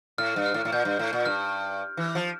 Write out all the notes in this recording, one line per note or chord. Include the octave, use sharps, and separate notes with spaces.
A2 F6
G2
F6
A2
A2
A#2 G6
G2
A2
A#2
G2 F6
E3
F3